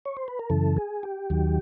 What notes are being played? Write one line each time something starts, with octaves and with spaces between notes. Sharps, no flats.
C#5
C5
B4
A#4
F#2 C#3 E3 A4
G#4
G4
D#2 D#3 F#3